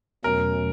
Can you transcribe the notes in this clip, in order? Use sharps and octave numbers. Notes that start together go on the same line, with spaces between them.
E2 B2 F#3 A3 C#4 A#4